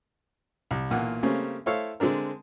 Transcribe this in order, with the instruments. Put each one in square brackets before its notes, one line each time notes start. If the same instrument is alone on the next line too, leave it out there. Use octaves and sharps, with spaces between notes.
[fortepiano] C2
B1 A#2 E3 A#3 F#5
C#3 G3 A3 A#3 C4 C#4
A3 E4 A4 C5 C#5 F5
D3 G#3 C4 D4 A#4